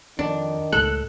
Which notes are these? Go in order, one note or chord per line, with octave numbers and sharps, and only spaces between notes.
F2 D#3 D4
C#2 A2 G#3 A4 F#6